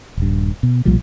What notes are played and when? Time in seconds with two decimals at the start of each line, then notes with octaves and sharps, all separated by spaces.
0.17 D#1 G2
0.63 B2
0.85 B1 A#2 F3 G3